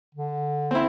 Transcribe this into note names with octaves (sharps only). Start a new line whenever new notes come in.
D3
C4 E4